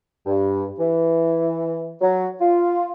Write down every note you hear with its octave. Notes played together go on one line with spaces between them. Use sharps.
G2
E3
F#3
F4